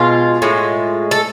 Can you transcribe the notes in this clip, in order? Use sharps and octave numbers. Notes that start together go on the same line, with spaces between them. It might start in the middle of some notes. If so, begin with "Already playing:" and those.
Already playing: B2 G#3 F4
A2 G#3
A4